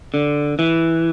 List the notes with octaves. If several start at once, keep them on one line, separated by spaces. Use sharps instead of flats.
D3
E3